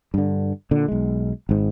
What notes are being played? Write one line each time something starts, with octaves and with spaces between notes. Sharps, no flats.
G2 D3
A#2 D3
B1 G#3
G#1 G#2